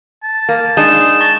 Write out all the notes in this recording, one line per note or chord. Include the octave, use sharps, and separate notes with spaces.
A5
A#3
G#3 D4 D#4 G#4 E7
A5 C#6 A#6 G7